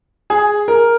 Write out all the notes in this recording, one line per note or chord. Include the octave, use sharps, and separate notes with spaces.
G#4
A#4